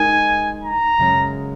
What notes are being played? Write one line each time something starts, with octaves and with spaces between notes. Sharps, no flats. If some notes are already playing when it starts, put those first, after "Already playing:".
Already playing: G#3 D#4 A#4 G#5
A#5
F#2 C#3 G#3 C#4